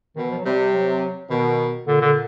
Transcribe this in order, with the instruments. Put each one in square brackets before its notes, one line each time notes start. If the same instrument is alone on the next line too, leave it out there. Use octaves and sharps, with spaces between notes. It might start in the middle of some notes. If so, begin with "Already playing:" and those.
[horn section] B2 [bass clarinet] D#3
[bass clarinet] E3
F3
F#3
[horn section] C3 [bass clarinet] G3
[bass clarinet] F#3
[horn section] B2 [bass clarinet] D#3
[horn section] A#2 [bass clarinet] D3
[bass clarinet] D3